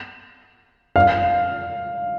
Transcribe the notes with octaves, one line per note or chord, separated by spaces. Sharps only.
F5